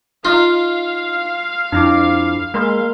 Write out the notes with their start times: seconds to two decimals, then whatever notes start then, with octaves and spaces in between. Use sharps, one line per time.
0.25 D#4 F4 F5
1.72 F2 D4 E4 D6
2.54 G#3 A#3 A#4 C6